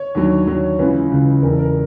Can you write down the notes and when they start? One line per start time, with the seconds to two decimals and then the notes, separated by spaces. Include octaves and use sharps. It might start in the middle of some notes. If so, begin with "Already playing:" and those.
Already playing: C#5
0.15 D#2 D3 F#3
0.47 D#2 D3 F#3
0.79 C#2 C#3 E3 B4
1.11 C#2 C#3 E3
1.42 E1 E2 C#3 A#4
1.51 A4
1.59 A#4